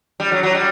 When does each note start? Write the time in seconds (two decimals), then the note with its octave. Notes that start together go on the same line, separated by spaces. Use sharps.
0.20 G3
0.32 F#3
0.43 F#3
0.55 G3